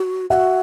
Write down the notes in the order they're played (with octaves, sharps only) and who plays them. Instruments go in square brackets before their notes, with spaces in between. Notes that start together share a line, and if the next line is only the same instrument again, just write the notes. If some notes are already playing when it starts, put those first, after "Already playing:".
Already playing: [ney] F#4
[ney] G4 [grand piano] E5 F#5
[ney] F#4